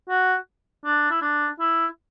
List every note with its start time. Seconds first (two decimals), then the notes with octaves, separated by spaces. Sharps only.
0.09 F#4
0.85 D4
1.11 E4
1.22 D4
1.60 E4